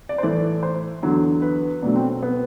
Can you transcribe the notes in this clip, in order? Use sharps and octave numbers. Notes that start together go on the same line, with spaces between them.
D5
C5
A2 E3 A3 D5
C5
E2 D3 F#3
B4
B2 F#3 A3 D4
C4
C4
B3